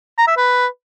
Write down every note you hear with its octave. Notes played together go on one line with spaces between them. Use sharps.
A#5
E5
B4